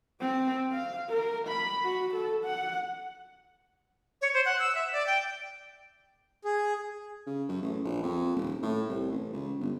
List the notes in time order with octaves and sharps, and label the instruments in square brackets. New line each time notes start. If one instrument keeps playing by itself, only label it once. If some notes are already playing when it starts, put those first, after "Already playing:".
[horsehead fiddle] C4
F5
A#4
B5
F#4
A4
F#5
[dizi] C#5
C5
F#5
E6
E5
D5
G5
[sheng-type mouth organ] G#4
[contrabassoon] C#3
F#2
A1
A#1
F2
D#1
A2
C2
A1
C#2
G1